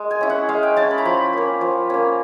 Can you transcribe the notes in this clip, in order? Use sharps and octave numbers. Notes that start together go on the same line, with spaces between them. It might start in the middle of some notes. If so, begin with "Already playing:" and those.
Already playing: G#3
G#5
C#4 E4
F#5
G#3 F5
G5
C#4 E4 A5
B5
A#5
F3 B5
A#3 C#4
F3
A#3 C#4